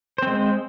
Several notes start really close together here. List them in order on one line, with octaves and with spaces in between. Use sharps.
C5 C4 G#3